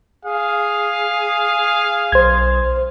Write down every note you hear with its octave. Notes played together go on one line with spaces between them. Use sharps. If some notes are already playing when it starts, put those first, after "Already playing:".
G#4 F5
B1 C5 G#6